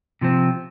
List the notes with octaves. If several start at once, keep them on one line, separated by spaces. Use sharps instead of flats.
C3 F3 C4